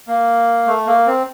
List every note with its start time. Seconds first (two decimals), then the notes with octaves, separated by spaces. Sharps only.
0.07 A#3
0.67 A3
0.86 A#3
1.06 C4